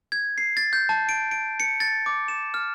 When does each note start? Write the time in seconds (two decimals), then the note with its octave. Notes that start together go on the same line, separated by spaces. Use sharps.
0.12 G#6
0.38 C7
0.57 A6
0.73 G6
0.89 A5
1.09 D7
1.31 D7
1.60 C#7
1.80 A6
2.06 D6
2.28 E7
2.54 F6